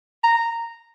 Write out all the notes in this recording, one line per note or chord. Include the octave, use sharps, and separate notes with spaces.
A#5